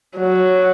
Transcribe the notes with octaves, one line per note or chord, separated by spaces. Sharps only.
F#3